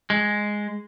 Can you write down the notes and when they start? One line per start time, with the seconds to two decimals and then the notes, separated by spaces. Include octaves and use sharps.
0.10 G#3